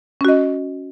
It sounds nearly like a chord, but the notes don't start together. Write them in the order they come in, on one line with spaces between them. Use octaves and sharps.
C#4 F#4 D#5